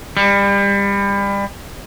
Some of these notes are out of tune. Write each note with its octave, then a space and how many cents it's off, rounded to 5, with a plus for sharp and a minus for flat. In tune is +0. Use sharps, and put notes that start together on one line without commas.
G3 +30